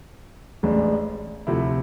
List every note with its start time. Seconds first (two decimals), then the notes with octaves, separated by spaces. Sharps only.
0.63 A1 A2 G#3 D4
1.47 D2 C3 F3 A3 E4